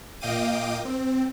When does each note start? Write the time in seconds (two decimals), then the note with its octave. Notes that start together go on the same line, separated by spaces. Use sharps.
0.21 A#2 D#5 F5 G5 D6 D#7
0.85 C4